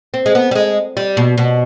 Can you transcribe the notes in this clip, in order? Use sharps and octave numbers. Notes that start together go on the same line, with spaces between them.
C4
G#3
B3
G3
G#3
G3
B2
B2